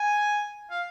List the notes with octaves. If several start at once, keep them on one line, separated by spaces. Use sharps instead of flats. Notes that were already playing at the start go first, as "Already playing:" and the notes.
Already playing: G#5
F5